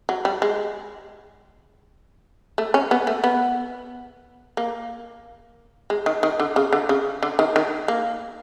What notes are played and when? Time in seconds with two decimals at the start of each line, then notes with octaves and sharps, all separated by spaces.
0.09 F#3
0.25 G3
0.42 G#3
2.58 A3
2.74 C#4
2.91 B3
3.07 A3
3.24 B3
4.57 A#3
5.90 G#3
6.06 D#3
6.23 D#3
6.40 D3
6.56 C#3
6.73 D3
6.89 C#3
7.23 D3
7.39 D#3
7.56 D#3
7.88 A#3